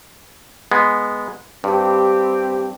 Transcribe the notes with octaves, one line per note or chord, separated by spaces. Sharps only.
G#3 B3
G2 C4 G4